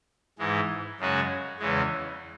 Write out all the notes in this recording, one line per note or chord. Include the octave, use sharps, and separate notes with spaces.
G#2 E3 G#3
F#2 C#3 G#3 C#4 F#4
E2 C#3 E3 G#3